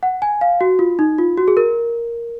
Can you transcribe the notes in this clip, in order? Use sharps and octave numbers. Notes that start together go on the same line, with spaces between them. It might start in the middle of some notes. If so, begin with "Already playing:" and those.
F#5
G#5
F5
F#4
F4
D#4
F4
F#4
G#4
A#4